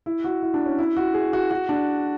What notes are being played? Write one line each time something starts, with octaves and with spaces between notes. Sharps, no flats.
E4
F#4
E4
D4
C#4
E4
F#4
G#4
F#4
F#4
D4